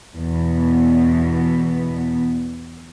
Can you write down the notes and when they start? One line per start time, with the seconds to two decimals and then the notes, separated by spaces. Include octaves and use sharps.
0.16 E2 B2 B3